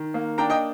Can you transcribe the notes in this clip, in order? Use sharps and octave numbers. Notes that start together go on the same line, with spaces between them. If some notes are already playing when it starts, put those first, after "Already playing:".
Already playing: D#3
A#3
D4 G5 A#5
D#5 G5